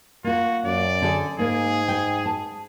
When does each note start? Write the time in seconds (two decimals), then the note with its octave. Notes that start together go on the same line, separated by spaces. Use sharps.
0.24 A#3 F4 F#4
0.64 F#2 D5
1.02 D3 D4 G#4
1.39 G#2 A#3 G#4
1.88 G5
2.26 A5